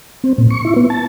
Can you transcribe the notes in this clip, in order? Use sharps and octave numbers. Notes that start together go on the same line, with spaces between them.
C4
A#2
C#6
E4
B3
A5